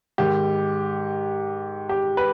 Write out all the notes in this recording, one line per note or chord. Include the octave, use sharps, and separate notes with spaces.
G#2 D#3 G4
G4
B4